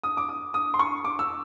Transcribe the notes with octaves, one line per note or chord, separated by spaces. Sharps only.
D#6
D6
D#6
D#6
C6
C#6
D6
E6